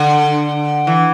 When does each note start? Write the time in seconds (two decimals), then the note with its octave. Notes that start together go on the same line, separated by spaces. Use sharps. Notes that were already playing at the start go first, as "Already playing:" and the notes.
Already playing: D3
0.87 E3